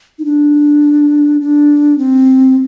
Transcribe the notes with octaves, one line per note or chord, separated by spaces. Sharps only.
D#4
D4
D4
C4